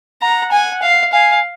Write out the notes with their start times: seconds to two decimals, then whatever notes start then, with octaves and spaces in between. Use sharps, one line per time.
0.22 F#5 A#5
0.52 G#5
0.82 F5
1.12 F5 G#5